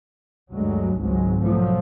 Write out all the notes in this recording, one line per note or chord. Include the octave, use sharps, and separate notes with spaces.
D2 G2 F#3 G#3
G#1 C#2 G#2 F#3 G#3
B1 F3 F#3 A3